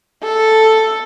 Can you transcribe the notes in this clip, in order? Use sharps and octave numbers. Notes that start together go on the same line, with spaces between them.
A4